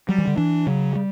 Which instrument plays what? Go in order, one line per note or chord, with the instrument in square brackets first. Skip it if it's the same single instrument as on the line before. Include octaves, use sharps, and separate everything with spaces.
[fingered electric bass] F#3 [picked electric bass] G3
[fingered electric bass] E3
D3
[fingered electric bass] E3 [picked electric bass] D4
[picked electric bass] C#3 [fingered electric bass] F#3
[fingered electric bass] G3